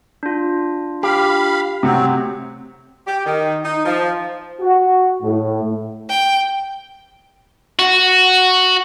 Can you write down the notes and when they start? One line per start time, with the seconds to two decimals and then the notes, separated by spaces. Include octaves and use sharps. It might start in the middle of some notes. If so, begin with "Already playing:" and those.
0.23 D4 F4
1.03 G4 F5 B5
1.83 C3 F#3 A3 C4 F#5
3.07 G4
3.26 D#3
3.65 D#4
3.85 F3
4.60 F#4
5.22 A2
6.09 G5
7.79 F#4